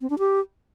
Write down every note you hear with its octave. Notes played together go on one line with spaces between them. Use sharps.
C4
D4
G4